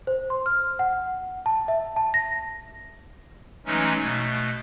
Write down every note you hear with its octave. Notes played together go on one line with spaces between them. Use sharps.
C5
C6
F6
F#5
A5
E5
A5
A#6
E3 F#3 G#3 A3 C#4 D#4
B2 A3